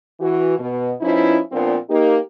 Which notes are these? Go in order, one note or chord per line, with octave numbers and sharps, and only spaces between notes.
E3 F#4
B2
F3 B3 C#4 D#4 E4
A#2 F3 B3 C4 D4 F4
A#3 D#4 G4